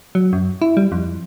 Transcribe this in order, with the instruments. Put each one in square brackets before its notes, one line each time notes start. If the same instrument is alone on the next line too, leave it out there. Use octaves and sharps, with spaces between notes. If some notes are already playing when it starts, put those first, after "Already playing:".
[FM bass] F#3
F#2
E4
G3
F2